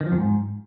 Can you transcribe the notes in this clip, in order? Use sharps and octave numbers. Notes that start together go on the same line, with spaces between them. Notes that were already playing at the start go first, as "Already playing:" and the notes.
D#3
F3
F2
G#2